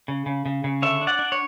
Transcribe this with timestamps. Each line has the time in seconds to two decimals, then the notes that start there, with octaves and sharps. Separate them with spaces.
0.08 C#3
0.26 C#3
0.46 C#3
0.64 C#3
0.82 D3 C#5 E5
1.01 D4
1.07 D5 F#5
1.19 D4
1.32 C#5